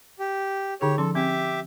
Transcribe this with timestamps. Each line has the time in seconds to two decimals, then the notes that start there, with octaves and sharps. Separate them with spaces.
0.19 G4
0.81 D3 D#4 G4 G#4 C#5
0.98 F3 C#4 A4 C6
1.15 C4 G4 E5 D6